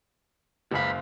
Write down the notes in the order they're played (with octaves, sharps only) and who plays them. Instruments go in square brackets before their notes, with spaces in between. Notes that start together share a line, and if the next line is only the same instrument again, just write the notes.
[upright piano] F#1 F#2 F5 [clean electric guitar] C#2 B5